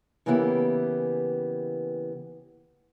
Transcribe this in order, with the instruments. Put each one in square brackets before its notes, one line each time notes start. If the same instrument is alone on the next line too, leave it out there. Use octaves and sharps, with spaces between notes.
[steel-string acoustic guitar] C#3 E3 A#3 B3 E4 G4